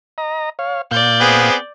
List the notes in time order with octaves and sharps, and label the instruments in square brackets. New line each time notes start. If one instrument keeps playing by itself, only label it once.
[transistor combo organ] D#5 A#5
C#5 F5
[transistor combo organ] A#2 F5 [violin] D5 G6
[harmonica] B3 C4 G#4